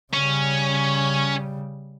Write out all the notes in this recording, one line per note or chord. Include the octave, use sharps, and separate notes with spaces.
C#3 G3 C#4